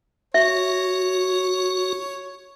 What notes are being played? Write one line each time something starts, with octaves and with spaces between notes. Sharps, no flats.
F#4 C#5 E5